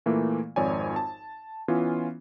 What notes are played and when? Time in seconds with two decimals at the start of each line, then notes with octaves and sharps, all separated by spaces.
0.06 A#2 E3 A3 A#3
0.56 G#1 F2 C#5 D5 G#5
0.96 A5
1.68 E3 B3 C#4 F4